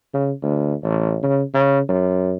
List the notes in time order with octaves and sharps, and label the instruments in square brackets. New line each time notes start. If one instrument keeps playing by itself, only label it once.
[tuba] C#3
D2
A1
C#3
C#3
F#2